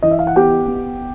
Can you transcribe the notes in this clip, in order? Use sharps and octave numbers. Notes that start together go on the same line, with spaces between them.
E3 D#5
E5
F5
F#5
B3 G4 G5
B3